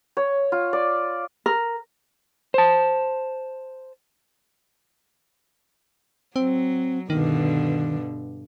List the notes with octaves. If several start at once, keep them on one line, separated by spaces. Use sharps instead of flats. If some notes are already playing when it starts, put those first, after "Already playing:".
C#5
F4
D5
A#4
C5 A5
F#3 C4
G2 B2 D3 D#3